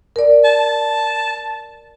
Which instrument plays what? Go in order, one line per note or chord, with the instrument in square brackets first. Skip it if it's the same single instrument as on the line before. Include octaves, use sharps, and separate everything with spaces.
[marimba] A#4 D5
[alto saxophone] A5